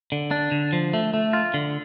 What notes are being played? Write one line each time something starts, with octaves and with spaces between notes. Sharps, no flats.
D3
D4
D3
F3
A3
A3
F4
D3